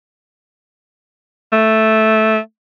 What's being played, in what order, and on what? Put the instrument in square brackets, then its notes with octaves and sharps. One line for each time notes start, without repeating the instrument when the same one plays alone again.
[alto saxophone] A3